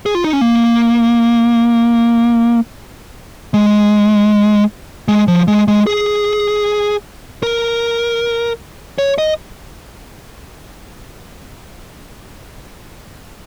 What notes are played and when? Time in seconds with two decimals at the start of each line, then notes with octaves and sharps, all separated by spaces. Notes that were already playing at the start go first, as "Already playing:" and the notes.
0.06 G#4
0.15 F4
0.24 D#4
0.33 C#4
0.41 A#3
3.54 G#3
5.08 G#3
5.28 F3
5.48 G#3
5.68 G#3
5.87 G#4
7.43 A#4
8.98 C#5
9.18 D#5